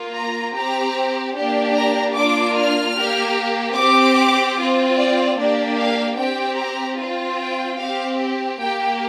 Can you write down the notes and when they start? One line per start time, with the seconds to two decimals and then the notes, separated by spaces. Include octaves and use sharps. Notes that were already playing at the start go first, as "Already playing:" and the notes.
Already playing: A#3 F4
0.14 A#5
0.55 C4 G4 A#5
1.36 A#3 D4 G4
1.76 A#5
2.16 A#3 D4 F4 D6
2.56 F6
2.96 A#3 G4
3.76 C4 G4 D6
4.57 C4 F4
4.97 D5
5.37 A#3 D4 G4 D5
5.78 F5
6.17 C4 G4 G5
6.58 A#5
6.98 C4 F4
7.38 G5
7.79 C4 G4 F5
8.59 A#3 G4 G5